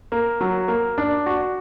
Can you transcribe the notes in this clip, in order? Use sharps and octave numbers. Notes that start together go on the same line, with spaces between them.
A#3
F#3
A#3
D4
F#4